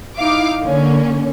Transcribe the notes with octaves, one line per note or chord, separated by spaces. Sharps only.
D#4 E4 F5 D6
D3 A#3 C#4